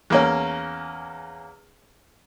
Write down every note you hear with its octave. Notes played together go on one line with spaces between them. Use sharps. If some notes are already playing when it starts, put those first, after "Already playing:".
E2 A#3 C#4